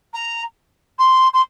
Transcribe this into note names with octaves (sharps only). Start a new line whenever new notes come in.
A#5
C6
C6